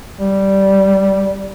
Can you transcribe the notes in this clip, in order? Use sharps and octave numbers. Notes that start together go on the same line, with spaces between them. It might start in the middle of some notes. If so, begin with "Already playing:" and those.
G3